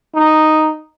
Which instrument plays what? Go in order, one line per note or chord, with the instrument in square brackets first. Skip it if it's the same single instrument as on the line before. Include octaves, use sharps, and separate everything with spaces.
[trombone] D#4